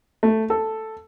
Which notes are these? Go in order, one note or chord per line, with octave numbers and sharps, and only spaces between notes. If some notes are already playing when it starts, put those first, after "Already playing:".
A3
A4